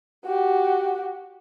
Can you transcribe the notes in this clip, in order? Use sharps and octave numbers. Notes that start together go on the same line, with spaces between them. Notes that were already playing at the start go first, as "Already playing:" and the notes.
F#4 G4